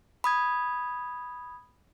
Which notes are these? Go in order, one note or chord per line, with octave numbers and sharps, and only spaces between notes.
B5 D#6 G#6